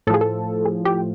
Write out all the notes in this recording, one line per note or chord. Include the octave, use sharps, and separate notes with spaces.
A2 F3 G#4 A4
A4
G#4
G4